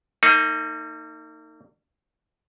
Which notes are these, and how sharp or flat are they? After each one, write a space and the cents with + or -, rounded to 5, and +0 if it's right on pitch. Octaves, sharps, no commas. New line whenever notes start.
A#3 -40 D#4 +5